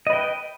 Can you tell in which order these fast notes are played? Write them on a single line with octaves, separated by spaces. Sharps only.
D#5 B4 G5